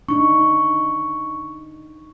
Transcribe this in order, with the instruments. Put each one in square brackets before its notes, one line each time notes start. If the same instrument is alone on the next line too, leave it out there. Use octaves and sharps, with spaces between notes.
[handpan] D4 D#4 [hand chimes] C#6